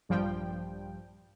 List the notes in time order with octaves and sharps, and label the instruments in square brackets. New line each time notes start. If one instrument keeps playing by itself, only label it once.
[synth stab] A#1 G2 F3 G3 G5